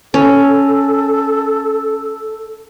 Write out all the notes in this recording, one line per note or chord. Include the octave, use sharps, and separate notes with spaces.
C#4 A4